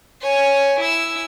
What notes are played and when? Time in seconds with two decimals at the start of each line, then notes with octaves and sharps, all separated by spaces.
0.22 C#5 G#5
0.80 E4 E6